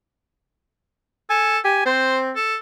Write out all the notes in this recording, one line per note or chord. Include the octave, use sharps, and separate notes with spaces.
A4 G#5
G4 G#5
C4 C5
A4